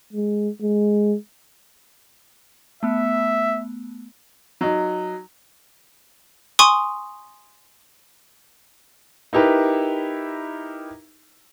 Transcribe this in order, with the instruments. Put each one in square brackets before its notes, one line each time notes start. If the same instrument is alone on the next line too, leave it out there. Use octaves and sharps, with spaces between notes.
[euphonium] G#3
G#3
[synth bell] A3 B3 [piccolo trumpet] E5
[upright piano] F#3 D#4
[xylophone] G#5 C6 C#6 D#6
[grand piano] D#4 E4 G4 A#4 B4